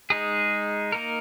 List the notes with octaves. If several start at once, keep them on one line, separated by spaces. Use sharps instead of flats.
G#3 D#4 G#4
A#3 D#4 A#4